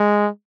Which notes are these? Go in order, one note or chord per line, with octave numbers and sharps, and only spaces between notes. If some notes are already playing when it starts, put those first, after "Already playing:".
Already playing: G#3